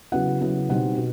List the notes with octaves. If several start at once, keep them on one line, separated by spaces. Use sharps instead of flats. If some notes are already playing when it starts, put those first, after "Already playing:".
C#3 F#3 B3 E4 F#5
C#3 F#3 B3 E4
B2 G3 C4 D#4 F#5
B2